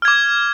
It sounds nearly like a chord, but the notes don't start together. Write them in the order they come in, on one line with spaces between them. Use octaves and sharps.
F6 G#6 D6